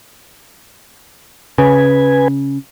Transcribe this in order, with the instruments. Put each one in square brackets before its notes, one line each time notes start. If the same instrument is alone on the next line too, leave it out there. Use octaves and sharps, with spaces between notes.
[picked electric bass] C#3 [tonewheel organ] B4 G#5